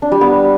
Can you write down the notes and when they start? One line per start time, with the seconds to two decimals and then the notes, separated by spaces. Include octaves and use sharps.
0.02 D4
0.12 G3
0.21 B3